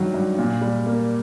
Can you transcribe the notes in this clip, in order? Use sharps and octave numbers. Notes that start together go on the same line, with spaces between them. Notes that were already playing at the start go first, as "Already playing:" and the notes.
Already playing: G2 D#3 F#3
G2
A#2
G3
A#3